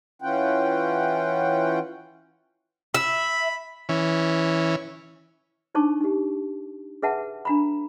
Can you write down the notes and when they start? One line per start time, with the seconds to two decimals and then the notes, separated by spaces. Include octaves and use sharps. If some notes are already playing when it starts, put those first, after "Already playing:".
0.22 E3 C#4 F4 F#5 G5
2.95 E5 B5
3.89 E3 C#4
5.75 D4 D#4 C5 A5 C#6 D6
6.01 D#4 G4
7.02 G#4 B4 E5 F#5 A5
7.45 D4 A#5 B5